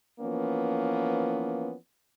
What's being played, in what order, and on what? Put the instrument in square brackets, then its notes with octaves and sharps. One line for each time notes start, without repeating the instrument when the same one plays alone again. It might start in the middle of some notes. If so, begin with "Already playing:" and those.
[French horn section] E3 F3 A#3 B3 C#4